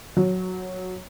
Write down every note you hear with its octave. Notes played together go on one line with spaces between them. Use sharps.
F#3